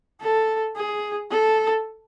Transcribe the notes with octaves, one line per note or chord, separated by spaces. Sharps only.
A4
G#4
A4